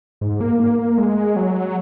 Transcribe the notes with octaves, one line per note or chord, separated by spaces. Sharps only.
G#2
A#3
A#3
A#3
G#3
F#3